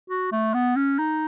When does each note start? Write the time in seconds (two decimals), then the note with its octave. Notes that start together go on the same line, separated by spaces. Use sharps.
0.10 F#4
0.32 A3
0.54 B3
0.76 C#4
0.99 D#4